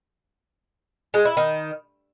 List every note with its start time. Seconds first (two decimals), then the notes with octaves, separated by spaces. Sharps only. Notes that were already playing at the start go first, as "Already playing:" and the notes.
1.14 G#3
1.25 E4
1.37 D#3